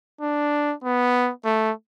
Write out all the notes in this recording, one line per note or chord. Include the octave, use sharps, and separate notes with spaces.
D4
B3
A3